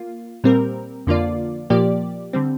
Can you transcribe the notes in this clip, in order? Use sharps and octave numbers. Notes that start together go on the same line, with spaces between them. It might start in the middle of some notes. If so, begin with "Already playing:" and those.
Already playing: A#3 F4
A#2 G3 C4 A#4
F2 D3 A#3 F4 D5
A#2 F3 A#3 G4 D5
D3 G3 C4